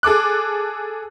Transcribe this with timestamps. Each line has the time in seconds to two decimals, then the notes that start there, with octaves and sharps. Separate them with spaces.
0.03 G#4 A4 D6 F#6